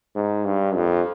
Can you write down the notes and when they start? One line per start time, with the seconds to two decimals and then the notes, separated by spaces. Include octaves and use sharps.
0.16 G#2
0.45 G2
0.75 F2